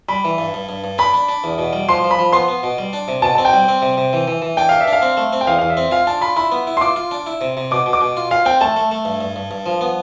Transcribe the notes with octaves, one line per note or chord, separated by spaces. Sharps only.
G3 B5
E3
G2
G2
G2
G2
D4 B5
D4
D4
E2
B2
G3
F3 C6
F3
B5
F3
B3 C6
B3
B2
G3
D4
C3
B2 A5
C4 A5
G5
G3
C4
C3
C3
E3
E3
E3
D4 G5
G4 F5
E5
D4
F5
C4
A3
C4
G5
E2 F5
E2 F5
E5
C4
F4 F5
D4 A5
F4 B5
E4 B5
B3
E4
C6
F4 D6
F4
D4
E4
C3
C3
B2 D6
B2
D6
B2
F4
F4 F5
C4 G5
A3 A5
A3
A3
G2
G2
G2
G2
F3
B3